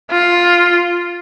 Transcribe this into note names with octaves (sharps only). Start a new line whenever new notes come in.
F4